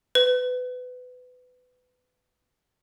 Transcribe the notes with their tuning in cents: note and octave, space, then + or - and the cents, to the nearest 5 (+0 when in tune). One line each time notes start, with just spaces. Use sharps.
B4 +25